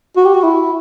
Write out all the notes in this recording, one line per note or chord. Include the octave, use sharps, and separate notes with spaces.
F#4
G4
F#4
E4